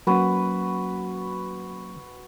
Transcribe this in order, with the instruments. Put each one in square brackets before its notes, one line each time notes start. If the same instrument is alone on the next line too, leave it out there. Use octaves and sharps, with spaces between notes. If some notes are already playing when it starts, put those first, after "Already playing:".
[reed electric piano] F#3 A#3 C#4 [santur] F#4 B4 F#5